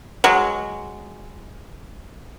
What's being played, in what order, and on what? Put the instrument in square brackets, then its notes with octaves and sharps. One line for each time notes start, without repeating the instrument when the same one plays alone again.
[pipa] F#3 G#3